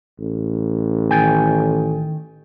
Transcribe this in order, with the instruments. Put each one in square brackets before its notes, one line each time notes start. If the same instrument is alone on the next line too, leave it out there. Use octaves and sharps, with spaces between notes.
[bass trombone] A1
[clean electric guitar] D#3 G5 G#5